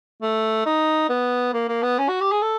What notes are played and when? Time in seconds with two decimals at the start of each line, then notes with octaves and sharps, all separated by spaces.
0.22 A3
0.66 D#4
1.09 B3
1.53 A#3
1.68 A#3
1.83 B3
1.99 C#4
2.09 F#4
2.21 G4
2.32 G#4
2.42 A4